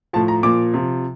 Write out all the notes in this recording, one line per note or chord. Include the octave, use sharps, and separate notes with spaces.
A2 F3 A5
A#5
A#2 F3 D6
C3 F3